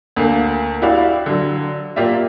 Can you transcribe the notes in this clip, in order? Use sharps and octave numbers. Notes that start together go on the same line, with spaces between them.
D2 A3 A#3
E4 F#4 G4 D5 F5
D3 F#3
A#3 F4 G4 D5 E5